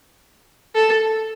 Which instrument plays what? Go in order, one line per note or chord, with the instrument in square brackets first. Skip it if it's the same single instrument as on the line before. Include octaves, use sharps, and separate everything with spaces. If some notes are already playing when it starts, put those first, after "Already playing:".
[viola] A4